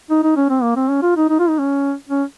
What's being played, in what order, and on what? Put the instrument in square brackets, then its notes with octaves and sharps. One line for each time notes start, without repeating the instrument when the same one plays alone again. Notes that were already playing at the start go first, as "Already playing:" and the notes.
[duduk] D#4
D#4
C#4
C4
A#3
C4
C#4
F4
D#4
D#4
F4
D#4
C#4
C#4